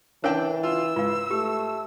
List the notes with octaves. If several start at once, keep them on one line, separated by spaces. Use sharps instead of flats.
E3 D4 A#4 C#5 F5 G5 A5
F4 E6
G#2 F4 B4 F5
A3 G4